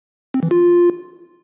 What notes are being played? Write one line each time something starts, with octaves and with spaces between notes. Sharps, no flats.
C4
E3
F4